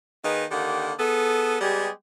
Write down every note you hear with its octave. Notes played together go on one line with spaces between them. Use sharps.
D#3 A#3 D#4 G#4 B4
D3 D#3 A#3 G4 F#5
B3 G#4 A4
G3 G#3 B3 G4 G#4